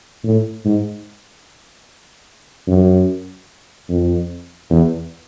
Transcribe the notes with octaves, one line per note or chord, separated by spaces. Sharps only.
A2
G#2
F#2
F2
E2